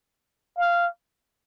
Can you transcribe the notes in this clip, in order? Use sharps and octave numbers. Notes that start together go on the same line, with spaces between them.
F5